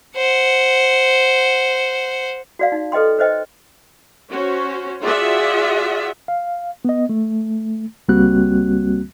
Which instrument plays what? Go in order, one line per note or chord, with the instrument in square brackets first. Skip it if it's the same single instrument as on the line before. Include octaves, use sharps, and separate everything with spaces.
[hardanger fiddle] C5 F#5
[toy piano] F#4 D5 F5
D#4
A4 B4 D#5 G5 C6
B4 C5 D#5 G5
[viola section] C#4 F#4 C5 C#5
F4 F#4 G#4 D5 E5 F#5
[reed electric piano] F5
B3 D#5
A3
C#2 G3 A#3 C4 F#4 F#6